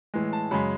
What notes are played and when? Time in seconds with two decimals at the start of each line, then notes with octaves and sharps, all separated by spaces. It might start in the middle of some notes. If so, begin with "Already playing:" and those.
0.14 A2 E3 G#3
0.33 A5
0.51 F#2 C#3 G#3 B5